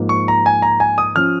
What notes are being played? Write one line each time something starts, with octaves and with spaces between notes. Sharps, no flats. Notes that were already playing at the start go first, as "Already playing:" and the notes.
Already playing: G#2 F3 A#3
C#6
A#5
G#5
A#5
G#5
D#6
F3 C#4 F6